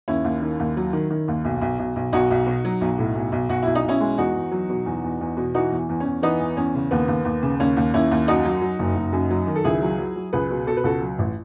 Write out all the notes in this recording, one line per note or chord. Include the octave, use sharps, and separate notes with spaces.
D#2 C#4 E4
D#2
D#3
D#2
F#3
D#3
D#3
D#2
B1
B1
B1
B1
B1 D#4 F#4
B1
B2
F#3
B1
A2
B1
B1
B1 F#4
B1 E4
D#4
B1 C#4 E4
G#3
E2 D#4 F#4
E2
F#3
B2
E2
E2
E2
B2
E3 D#4 F#4
E2
E2
C#4
E2
E3 B3 D#4
E2
E2 C#4
C#3
D#2 B3
D#2
D#2
C#3
D#2 C#4
D#2
D#2 C#4 E4
D#2
F#2 D#4 F#4
F#3
F#3
F#1
F#1
F#2
F#3
D#3
A4
C#2 E4 G#4
F#3
F#3
F#3
C#2 G#4 B4
B2
B2 A4
B4
C#2 F#4 A4
F#3
A1